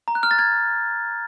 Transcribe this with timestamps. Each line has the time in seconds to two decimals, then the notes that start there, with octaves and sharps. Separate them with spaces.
0.08 A#5
0.15 F#6
0.23 F6
0.31 A6
0.39 G#6